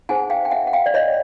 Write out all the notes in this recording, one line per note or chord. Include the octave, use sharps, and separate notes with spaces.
D#4 G#4 C5 F#5 G#5
F5 G5
G5
E5 F#5
F#5
F5 G5
D5
C#5 D#5